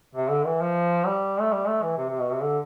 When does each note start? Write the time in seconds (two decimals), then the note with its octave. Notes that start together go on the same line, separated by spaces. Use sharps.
0.15 C3
0.30 D3
0.45 E3
0.61 F3
1.06 G3
1.40 A3
1.52 G3
1.67 A3
1.83 E3
1.98 C3
2.09 C3
2.20 B2
2.32 C3
2.43 D3